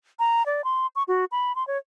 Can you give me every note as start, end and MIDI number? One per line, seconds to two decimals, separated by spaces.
0.19 0.45 82
0.46 0.64 74
0.64 0.87 84
0.96 1.03 85
1.08 1.25 66
1.32 1.55 83
1.56 1.66 84
1.67 1.78 73